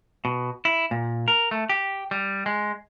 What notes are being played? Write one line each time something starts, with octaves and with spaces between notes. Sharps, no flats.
B2
E4
A#2
A#4
A3
G4
G3
G#3